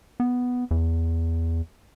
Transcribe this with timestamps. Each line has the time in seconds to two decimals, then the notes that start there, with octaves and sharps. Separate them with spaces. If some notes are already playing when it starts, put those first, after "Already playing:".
0.20 B3
0.71 E2